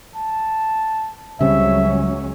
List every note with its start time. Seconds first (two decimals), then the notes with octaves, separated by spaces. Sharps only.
0.16 A5
1.41 C#2 C#3 F#3 G3 C4 C#4 E5